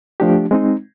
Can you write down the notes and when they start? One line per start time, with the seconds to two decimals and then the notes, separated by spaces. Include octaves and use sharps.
0.20 F3 A3 D4 G4
0.51 G#3 C4 D#4